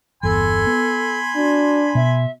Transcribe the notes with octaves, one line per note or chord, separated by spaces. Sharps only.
G1 E2 A4 G#5 B5 C6
B3
D4 F#4
B2 E5